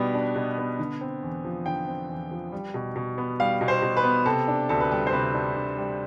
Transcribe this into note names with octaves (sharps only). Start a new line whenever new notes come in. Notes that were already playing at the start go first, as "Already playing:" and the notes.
Already playing: B2 G3 B3 D4 B4
D4
B2
B3
D3
C4
E2
F3
D3 G5
C4
E2
F3
G3
B2
B2
B3
G3 F5
B2
C5
B2
B4
B3
C3 A4
D4
D2 A4
B4
G3 A4
C5
C3 B4
D4
D2
G3